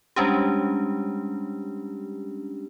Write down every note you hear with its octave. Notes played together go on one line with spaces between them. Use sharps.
G3 G#3 C#4 D4 G4